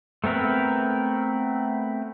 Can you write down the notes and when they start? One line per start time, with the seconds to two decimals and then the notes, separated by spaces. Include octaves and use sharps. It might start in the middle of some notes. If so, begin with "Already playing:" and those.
0.24 A3 B3 C4 A#4 B4